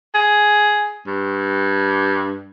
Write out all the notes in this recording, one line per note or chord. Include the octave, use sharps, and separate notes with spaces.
G#4
G2